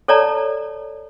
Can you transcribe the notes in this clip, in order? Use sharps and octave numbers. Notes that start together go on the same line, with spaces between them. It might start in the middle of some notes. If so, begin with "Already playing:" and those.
A4 C#5 D5 A5 A#5